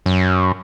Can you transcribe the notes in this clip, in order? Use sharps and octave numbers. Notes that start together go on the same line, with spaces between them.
F#2